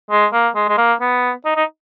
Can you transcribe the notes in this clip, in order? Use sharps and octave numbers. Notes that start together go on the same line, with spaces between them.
G#3
A#3
G#3
G#3
A#3
B3
D#4
D#4